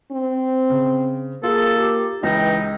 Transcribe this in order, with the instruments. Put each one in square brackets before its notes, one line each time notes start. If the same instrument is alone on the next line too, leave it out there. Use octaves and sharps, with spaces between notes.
[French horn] C4
[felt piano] C#3
[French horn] A#3 [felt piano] F4 [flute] G#4 [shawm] A4
[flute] G4
[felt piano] C#2 [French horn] E3 [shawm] D#4 [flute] G5